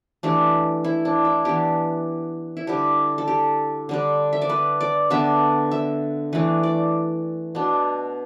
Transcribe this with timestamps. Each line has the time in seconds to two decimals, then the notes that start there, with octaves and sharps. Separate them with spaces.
0.23 E3 A3 D4 G4
0.84 E4
1.05 D4
1.25 E4
1.45 E3 B3 D4 G4
2.57 E4
2.67 D3 G3 D4 G4
3.18 A4
3.28 G4
3.89 D3 G3 D4
4.33 E5
4.42 D5
4.49 B4
4.81 D5
5.10 D3 B3 D4 E5
5.71 E5
6.33 E3 A3 D4 B4
6.63 D5
7.55 B2 B3 D4